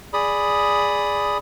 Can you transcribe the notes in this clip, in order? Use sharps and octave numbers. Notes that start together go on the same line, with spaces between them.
G#4 D5 B5 D#6